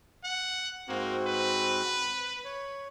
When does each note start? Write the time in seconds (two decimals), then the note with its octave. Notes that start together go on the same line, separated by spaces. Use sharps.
0.24 F#5
0.88 G#2 A#3 C4 F#4
1.27 B4
2.45 C#5